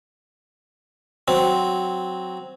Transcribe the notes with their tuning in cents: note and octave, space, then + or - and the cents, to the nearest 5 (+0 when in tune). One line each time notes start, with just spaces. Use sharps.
F#3 +0 C4 +0